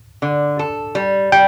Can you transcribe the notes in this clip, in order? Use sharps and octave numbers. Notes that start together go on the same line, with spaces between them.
D3
A4
G3
G3 G5